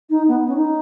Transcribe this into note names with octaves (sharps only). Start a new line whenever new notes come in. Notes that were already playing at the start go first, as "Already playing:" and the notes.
D#4
B3
C#4
D#4